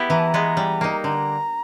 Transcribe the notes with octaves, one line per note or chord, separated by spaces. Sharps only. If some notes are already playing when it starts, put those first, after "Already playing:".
Already playing: B3 E4 G4
E3 A#5
A5
A#5
G#3 B3
G3
A#3 D#4
D3 A#5